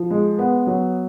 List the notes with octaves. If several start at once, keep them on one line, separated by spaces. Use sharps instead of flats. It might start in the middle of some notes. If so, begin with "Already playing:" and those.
Already playing: F3
G#3
B3
F#3